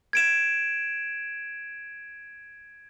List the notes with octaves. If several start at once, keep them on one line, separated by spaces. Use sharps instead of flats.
G#6 D7 E7